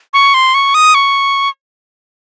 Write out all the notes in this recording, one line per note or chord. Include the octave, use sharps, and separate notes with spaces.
C#6
C6
C#6
D#6
C#6